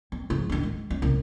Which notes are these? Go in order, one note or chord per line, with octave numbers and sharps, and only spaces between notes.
C4
G#2 F3
D#3 D4
G#3
C#4
C2